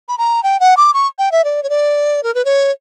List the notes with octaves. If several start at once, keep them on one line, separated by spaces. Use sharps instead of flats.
B5
A#5
G5
F#5
D6
C#6
G5
E5
D5
C#5
D5
A#4
B4
C#5